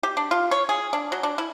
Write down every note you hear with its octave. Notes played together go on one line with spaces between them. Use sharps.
G4
D4
F4
C#5
G#4
D4
F#3
D4
E4